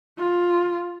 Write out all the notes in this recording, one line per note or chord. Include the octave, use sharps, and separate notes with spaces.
F4